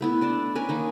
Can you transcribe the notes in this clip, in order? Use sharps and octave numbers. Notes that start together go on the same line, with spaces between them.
A3 B3 E4
D4 D5 D#5 A5
C#4 A#4 B4 G#5
D#3 A#3 D#4